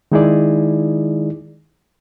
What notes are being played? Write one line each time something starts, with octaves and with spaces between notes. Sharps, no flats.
D#3 G#3 D#4 E4 G#4 D5